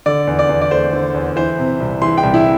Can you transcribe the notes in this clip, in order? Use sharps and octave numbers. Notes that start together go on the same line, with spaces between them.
D3 D5
E2
D5
E2
D5
A3 C5
D3
E2
E3 C5
C3
C2
E3 C6
G5
C2
E4